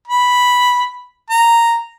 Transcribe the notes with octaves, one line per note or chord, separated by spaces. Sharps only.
B5
A#5